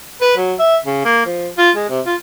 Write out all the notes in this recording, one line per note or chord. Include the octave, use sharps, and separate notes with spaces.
B4
F#3
E5
C#3
A#3
F3
F4
G#3
C3
F4